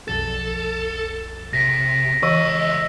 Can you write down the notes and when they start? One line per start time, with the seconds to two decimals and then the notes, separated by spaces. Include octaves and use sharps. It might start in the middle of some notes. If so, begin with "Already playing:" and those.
0.08 B1 F2 A4 A6
1.53 C3 A#6 B6 D7
2.23 C#2 E3 D#5 E6